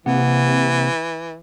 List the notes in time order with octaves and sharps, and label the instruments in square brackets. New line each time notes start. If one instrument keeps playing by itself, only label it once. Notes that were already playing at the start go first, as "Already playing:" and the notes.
[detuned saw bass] C3 [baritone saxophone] E3 [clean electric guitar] A#3 F#5